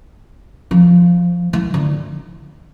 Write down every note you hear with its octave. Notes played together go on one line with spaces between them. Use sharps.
F3
E3
D3